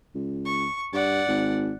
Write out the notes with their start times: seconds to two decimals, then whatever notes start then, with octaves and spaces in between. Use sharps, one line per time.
0.15 C#2
0.45 C#6
0.93 G2 D5 F#5
1.28 G#1